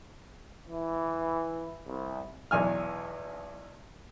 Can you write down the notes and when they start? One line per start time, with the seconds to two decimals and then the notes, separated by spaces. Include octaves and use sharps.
0.70 E3
1.87 C2
2.51 B1 E2 G#5 F6